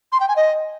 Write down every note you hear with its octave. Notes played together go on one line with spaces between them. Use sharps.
C6
G5
G#5
D#5